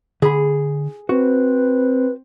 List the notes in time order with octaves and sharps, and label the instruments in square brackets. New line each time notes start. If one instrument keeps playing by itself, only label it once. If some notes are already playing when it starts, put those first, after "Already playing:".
[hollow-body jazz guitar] D3 B5 [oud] G#4
[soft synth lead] C4 [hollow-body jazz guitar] F#4 [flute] B4